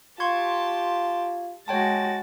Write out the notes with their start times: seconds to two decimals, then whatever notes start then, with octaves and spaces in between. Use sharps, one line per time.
0.20 F4 G4 A5 C6 C#6 G#6
1.68 G#3 F#4 C#5 G5 A5 A6